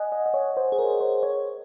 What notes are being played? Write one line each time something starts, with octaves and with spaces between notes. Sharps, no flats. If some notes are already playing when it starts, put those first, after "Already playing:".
Already playing: D#5 F#5 G#5
D#5
D#5
C#5
C5
G#4
A#4
C5
C#5